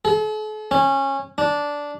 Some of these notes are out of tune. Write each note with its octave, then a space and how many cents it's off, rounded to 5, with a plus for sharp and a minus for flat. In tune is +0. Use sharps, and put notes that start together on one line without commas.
A4 -45
C#4 -20
D4 -10